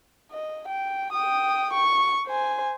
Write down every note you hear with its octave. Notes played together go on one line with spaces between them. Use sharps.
D#5
G5
G5 D#6
C#6
C5 G#5